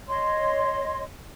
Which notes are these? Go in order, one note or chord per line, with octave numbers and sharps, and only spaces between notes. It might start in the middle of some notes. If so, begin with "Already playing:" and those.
C#5 D#5 C6